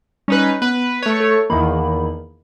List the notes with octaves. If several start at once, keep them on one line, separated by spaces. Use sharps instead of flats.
G3 C#4 D#4 B4
B3 B4
A3 C#5
A4
E2 D#3 A#3 B5